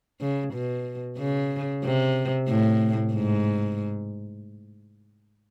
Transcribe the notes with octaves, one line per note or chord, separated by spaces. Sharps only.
C#3
B2
C#3
C3
A2
G#2